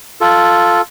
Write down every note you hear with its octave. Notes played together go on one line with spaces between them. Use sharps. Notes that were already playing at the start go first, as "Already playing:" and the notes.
F4 A4